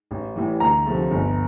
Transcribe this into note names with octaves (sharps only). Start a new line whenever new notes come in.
A1
A2 E3 G3
D2 A#5
C3 F3 A3
G1